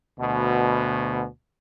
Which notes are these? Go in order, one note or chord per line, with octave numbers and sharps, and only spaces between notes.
D2 B2